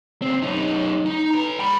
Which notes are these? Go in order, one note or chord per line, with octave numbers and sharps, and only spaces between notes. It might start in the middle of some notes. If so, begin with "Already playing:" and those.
C#3 C4
F#2 D#4
D#4
B4 A#5
G5 B5